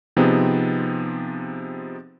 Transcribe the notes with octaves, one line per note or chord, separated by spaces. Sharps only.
C3 F3 B3 C4 D#4 G#4